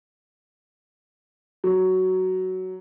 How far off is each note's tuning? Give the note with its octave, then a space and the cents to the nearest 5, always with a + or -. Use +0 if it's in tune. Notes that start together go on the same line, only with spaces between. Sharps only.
F#3 +10